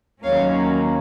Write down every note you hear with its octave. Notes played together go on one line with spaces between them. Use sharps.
D#2 D#3 F#3 A#3 C#4 C#5 F5